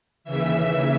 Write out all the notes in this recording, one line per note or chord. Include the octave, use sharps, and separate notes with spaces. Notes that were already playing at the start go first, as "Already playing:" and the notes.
D#2 C#3 E3 E5
E5